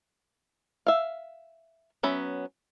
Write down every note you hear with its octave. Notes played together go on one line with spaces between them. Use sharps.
E5 F5
F#3 B3 C#4 E5 B5